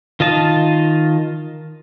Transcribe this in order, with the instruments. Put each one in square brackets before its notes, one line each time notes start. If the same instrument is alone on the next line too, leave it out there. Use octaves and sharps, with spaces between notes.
[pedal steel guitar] D#3 F4 D#5 A5